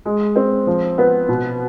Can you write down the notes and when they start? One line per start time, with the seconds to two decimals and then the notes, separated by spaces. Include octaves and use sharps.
0.05 G#3
0.36 C4
0.67 F3
0.98 B3
1.28 B2